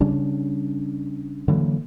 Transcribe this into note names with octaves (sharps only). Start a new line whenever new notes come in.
C#3 G3 C#4 D4
D3 E3 F#3 A#3